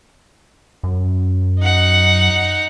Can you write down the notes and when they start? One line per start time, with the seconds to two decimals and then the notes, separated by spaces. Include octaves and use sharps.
0.83 F#2
1.60 D#4 F#5